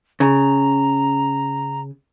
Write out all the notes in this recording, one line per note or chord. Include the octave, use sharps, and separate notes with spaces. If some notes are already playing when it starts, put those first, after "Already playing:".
C#3 A#5